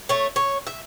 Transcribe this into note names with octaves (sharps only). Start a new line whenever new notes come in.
A3 C#5
C#5
E5